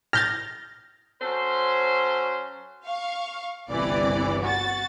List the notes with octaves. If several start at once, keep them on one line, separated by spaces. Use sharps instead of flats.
F6 G6 A6 A#6
F#3 C#4 A4 C5
F5 C#6
G1 C2 C3 E3 D5
F#4 A6